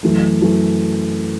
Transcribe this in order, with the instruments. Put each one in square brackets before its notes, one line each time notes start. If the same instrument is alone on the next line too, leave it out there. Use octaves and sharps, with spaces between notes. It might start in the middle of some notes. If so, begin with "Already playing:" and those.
[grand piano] F#2 E3 A3
F#2 E3 A3